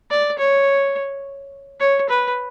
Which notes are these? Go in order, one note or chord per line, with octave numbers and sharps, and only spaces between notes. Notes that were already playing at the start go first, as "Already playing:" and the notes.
D5
C#5
C#5
B4